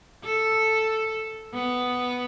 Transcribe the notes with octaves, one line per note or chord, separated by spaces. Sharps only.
A4
B3